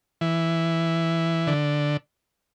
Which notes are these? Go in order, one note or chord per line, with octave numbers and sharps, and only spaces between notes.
E3
D3